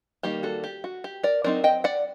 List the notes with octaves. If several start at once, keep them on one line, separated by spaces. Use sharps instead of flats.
D#3 G3 A#3 D#4 G4
F#4 A4
G4
F#4
G4
A#4 D5
F#3 C4 D#4 A#4 D5
D#5 G5
D5 F#5